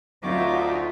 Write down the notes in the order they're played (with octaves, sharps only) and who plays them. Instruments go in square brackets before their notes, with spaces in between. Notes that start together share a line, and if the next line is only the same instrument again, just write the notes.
[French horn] D2 [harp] F#3 C4 [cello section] D#4 F4 E5 [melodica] F#4 D6